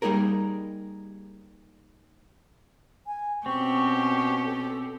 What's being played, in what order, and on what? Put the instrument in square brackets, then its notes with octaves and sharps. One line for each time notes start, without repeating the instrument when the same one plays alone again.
[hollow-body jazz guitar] G3 A#3 D#4 G#4 A#4
[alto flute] G#5
[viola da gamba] B2 C#4 G4 [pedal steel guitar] C4 [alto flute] C#6
[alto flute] A4